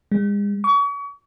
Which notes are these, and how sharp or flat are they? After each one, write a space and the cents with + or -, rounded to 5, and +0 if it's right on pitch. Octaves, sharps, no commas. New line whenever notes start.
G#3 -35
C#6 +35